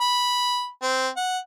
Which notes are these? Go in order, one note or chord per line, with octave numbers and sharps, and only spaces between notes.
B5
C4
F#5